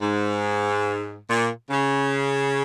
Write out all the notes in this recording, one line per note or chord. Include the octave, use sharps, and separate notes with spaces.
G#2
A#2
C#3